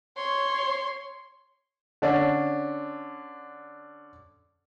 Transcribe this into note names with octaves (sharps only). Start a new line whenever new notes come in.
C#5 C6
D3 C#4 D4